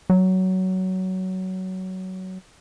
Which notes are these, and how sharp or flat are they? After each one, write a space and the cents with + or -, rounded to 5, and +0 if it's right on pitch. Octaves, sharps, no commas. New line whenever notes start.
F#3 +15